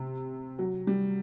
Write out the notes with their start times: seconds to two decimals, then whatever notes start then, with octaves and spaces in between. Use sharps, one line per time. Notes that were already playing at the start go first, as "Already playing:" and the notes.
Already playing: C3
0.59 F#3
0.87 G3